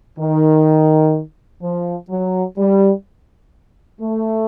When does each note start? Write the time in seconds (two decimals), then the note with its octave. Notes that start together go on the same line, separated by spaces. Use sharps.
0.19 D#3
1.62 F3
2.10 F#3
2.58 G3
4.01 A3